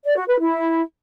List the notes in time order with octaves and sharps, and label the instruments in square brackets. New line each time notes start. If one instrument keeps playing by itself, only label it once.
[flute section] D5
F#4
B4
E4